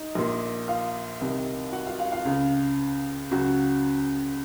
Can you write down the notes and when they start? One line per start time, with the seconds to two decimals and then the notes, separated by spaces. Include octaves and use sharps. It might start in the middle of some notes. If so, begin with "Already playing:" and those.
Already playing: D#4
0.15 A#1 A#2
0.68 F4 F5
1.21 C2 C3 D#3
1.73 F#4 F#5
1.87 F4 F5
1.99 F4 F5
2.12 F4 F5
2.25 C#2 C#3
3.31 C#2 C#3 F#3 F#4